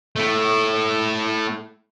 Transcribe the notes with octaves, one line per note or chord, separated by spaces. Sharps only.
A3 E4